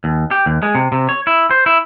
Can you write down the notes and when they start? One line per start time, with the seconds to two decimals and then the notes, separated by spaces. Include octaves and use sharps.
0.04 D#2
0.31 G4
0.46 D#2
0.63 G#3
0.75 C3
0.92 C3
1.09 C#5
1.27 E4
1.51 C5
1.66 E4